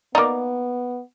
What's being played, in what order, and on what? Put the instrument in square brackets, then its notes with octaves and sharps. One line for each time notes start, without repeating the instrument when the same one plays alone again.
[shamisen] A#3 D#4 [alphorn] B3 [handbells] D5 A#5 D6